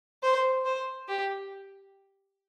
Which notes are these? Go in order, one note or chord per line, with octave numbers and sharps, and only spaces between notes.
C5
C5
G4